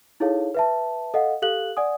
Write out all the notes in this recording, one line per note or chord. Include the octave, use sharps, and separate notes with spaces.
D#4 E4 G#4 A4 C#5 F5
B4 E5 A5
A4 D#5 F5 F#5
G4 A4 F5 F#6 F#7
D5 F#5 G#5 D#6